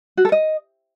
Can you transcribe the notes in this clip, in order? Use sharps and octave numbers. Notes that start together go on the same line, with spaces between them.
F#4
A4
D#5